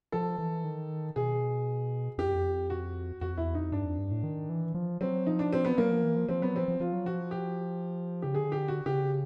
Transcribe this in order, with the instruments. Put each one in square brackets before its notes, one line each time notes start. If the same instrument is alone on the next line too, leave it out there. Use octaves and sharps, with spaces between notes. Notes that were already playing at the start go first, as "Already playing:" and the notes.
[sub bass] F3 [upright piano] A4
[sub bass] E3
D#3
[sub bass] B2 [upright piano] G#4
[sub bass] F2 [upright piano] G4
[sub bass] F#2
F2
[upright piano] F#4
[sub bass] F2 [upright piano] F#4
[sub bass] E2 [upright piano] E4
[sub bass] F2 [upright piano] D#4
[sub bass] G2 [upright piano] D4
[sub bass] F2
G2
A2
D#3
E3
F3
[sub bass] F#3 [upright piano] C4
[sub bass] F3 [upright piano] D#4
[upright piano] D4
C4
B3
[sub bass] F#3 [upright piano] A#3
[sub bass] F3
E3
F3
[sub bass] F3 [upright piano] C4
[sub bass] F#3 [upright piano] B3
[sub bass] F3 [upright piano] C4
[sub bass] F3
[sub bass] F3 [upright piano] F4
[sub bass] F#3
[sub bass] F3 [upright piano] F#4
[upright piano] G4
[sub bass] C#3 [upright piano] G4
[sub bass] D3 [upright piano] G#4
[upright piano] G4
F#4
[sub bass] C#3 [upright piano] G4